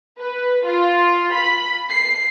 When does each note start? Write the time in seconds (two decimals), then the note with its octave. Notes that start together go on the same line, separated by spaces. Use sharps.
0.19 B4
0.65 F4
1.32 B5
1.89 C7